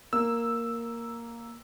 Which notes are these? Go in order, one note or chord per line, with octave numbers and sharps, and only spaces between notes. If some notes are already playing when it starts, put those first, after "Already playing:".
A#3 E6